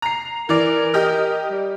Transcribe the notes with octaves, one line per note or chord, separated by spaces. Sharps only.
A#5 C7
E3 A#4 D5
G4 D#5 F6
G3